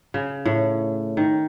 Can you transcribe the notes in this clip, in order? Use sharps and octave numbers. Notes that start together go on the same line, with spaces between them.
C#3
A2
D#3